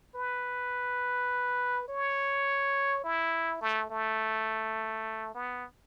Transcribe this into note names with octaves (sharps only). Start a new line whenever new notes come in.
B4
C#5
E4
A3
A3
B3